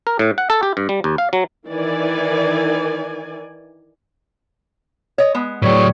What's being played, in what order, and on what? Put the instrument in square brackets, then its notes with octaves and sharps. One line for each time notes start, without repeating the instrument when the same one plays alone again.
[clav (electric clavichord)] A#4
A2
F#5
A4
G4
G2
G3
D#2
F5
F#3
[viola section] D#3 E3 D5 G#5
[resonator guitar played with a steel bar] C#5 D#5
G#3 B3
[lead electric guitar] A2 F#3 [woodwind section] G3 G#4 C#5 [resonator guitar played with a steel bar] B4